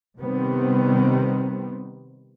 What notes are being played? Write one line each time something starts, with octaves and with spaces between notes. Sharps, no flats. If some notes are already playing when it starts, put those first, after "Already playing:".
C3 D#3 G3 B3 C4